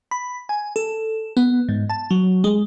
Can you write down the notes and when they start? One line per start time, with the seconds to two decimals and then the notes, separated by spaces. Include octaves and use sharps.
0.11 B5
0.49 G#5
0.76 A4
1.37 B3
1.69 G#2
1.90 A5
2.11 F#3
2.44 G#3